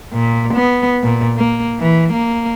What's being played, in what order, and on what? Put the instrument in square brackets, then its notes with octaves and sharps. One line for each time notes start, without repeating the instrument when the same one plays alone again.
[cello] A#2
B3
A#2
A#3
E3
A#3